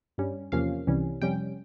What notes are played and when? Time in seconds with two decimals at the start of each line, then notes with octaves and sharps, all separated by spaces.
0.18 G2 G3 C#4
0.52 E2 C3 F3 A#3 C#4 F5
0.87 C2 C3 E3 G3 C#4
1.22 F2 C3 G3 C#4 G5